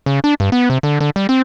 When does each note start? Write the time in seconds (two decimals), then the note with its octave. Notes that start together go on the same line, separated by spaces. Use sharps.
0.06 C#3
0.24 D4
0.40 G2
0.52 B3
0.70 C3
0.83 D3
1.01 D3
1.16 G3
1.29 C4